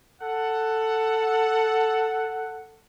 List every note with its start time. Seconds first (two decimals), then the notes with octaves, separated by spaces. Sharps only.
0.21 A4 F#5